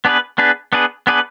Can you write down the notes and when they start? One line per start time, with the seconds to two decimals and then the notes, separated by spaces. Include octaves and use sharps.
0.05 B3 D4 G#4 B4
0.38 B3 D4 G#4 B4
0.73 B3 D4 G#4 B4
1.07 B3 D4 G#4 B4